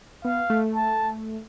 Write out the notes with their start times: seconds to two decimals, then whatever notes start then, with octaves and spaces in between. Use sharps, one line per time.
0.25 B3 F5
0.50 A3
0.75 A5